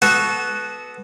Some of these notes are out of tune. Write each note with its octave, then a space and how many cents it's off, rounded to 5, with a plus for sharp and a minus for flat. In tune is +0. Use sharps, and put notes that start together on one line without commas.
B3 +0 F#4 +0 A4 -25